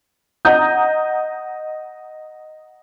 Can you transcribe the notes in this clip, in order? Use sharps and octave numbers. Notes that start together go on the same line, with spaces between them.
D#5 F#5 A#5 D#6 G6